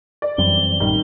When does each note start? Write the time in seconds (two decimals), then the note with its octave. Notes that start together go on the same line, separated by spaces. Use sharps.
0.22 D5
0.38 F#2 E3 G3 C4 G7
0.80 A1 D#3 G3